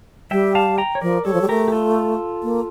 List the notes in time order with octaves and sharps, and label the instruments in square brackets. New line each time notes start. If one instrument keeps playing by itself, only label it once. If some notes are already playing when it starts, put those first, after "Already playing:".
[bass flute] G3 [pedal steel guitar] E5 G5
[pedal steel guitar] F5 A5
G5 A#5
C#5
[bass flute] F3 [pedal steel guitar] A#4 D5
[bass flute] G3 [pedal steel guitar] A4 C#5
[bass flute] F3
G3
[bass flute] A3 [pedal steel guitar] G4 A#4
[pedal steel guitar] G4
F4 A4
[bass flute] A#3